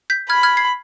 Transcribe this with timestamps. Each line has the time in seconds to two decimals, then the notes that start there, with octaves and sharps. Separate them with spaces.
0.10 G6 B6
0.30 B5 F6 G#6
0.43 F6 G#6
0.57 G#6 C7